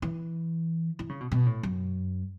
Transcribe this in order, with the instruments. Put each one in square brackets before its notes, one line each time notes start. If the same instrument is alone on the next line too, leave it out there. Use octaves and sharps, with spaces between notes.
[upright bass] E3
E3
C#3
B2
B2
A2
F#2